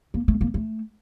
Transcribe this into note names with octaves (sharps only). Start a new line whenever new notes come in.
A#3
A3
A#3
A3